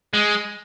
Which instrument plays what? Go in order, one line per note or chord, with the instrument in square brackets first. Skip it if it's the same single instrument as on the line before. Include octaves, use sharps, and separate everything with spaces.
[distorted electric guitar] G#3